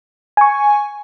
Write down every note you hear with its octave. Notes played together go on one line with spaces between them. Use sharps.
G#5 C#6